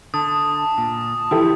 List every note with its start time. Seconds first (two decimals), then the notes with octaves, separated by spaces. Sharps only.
0.14 D3 A5 D#6
0.78 A#2
1.31 D3 E3 F3 E4 G4 A4